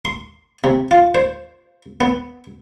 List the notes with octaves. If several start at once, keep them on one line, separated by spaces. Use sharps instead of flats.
C6
C3
F4
C5
B3